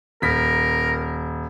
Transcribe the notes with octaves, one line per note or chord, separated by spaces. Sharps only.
D#1 A#4 B6